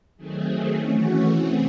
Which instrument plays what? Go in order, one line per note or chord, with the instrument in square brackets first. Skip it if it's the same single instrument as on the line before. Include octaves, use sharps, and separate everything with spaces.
[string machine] D#3 F#3 A3 C4 G#4
G#4
E3 A3 C#4 F#4
F#4
C3 E3 A3 C4 G#4